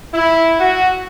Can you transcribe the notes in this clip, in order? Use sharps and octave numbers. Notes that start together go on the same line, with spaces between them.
E4
F#4